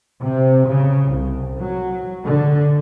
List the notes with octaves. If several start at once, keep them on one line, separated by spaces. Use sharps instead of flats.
C3
C#3
C2
F#3
D3